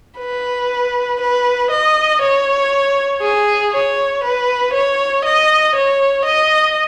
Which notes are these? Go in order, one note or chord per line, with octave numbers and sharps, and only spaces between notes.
B4
B4
D#5
C#5
G#4
C#5
B4
C#5
D#5
C#5
D#5